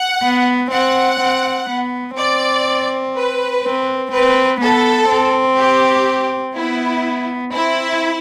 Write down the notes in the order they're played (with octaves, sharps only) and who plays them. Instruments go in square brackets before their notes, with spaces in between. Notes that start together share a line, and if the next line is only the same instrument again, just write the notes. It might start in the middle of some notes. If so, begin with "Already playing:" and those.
Already playing: [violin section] F#5
[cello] B3
[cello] C4 [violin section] F#5
[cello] C4
B3
[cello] C4 [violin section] D5
[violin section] B4
[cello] C4
[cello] C4 [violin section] B4
[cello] B3 [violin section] A4
[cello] C4
[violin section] G4
[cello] B3 [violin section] E4
[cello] C4 [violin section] E4